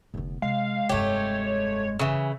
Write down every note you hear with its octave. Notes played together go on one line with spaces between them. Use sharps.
F1 D3 B3
C3 G#3 F5
F1 G2 A3 G4 C#5
C#3 E3